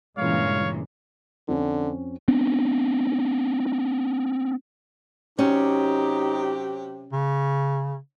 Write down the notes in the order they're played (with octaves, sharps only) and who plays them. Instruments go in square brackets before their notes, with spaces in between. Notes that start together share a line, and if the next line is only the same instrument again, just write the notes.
[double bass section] G2 E3 G#3 [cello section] A#2 C#3 [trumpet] C#5 [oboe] F5
[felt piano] F2 C4 C#4 [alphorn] D3
[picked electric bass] B3 C4 D4
[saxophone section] C3 F#3 G4 [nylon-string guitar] C#4 [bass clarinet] D#4
[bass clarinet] C#3